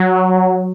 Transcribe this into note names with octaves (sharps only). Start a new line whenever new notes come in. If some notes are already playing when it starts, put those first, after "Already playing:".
Already playing: F#3